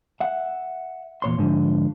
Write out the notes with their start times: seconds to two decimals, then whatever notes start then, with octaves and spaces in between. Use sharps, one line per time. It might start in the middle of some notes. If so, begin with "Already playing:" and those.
0.20 E5 F#5
1.22 E2 A#2 C#5 C6
1.38 G#2 D3 F3